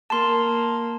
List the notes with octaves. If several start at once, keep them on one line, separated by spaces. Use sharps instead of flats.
A#3 A5 C6